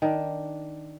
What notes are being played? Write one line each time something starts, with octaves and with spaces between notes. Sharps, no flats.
D#3 D4